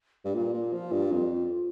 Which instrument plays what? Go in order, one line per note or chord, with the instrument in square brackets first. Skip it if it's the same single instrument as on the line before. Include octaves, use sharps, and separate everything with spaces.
[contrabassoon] G2 [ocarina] D4
[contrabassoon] A#2 [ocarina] F4
[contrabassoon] A#2
F3
G2
F2